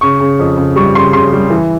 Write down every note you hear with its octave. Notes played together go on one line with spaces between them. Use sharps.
C#3 C#6
C#3
F2
C#3
G3 C#6
C#3 C6
C#3 C6
G3
E3